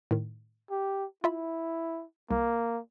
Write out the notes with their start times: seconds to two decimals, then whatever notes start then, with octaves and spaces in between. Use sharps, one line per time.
0.11 A2 D#3
0.71 G4
1.24 E4 F4 E5 B5
2.31 C2 A#3